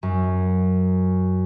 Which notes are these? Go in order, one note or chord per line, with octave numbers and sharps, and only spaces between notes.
F#2